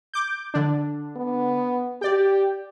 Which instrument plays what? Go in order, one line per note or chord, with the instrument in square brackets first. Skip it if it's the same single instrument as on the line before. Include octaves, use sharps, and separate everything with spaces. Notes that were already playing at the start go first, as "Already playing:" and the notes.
[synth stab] D6 G6
D3 D4
[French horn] B3
[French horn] G4 [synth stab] D5 G5